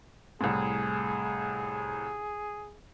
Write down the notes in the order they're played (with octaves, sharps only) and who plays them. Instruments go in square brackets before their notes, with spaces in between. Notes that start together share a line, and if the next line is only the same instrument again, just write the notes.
[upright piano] C2 A2 [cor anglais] G#4